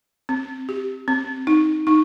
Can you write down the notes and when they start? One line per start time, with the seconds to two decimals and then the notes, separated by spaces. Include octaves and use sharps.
0.29 C4
0.69 G4
1.08 C4
1.47 D#4
1.87 D#4